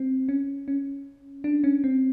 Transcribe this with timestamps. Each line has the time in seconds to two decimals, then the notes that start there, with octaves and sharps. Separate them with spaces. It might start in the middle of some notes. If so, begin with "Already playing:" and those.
Already playing: C4
0.29 C#4
0.68 C#4
1.44 D4
1.64 C#4
1.84 C4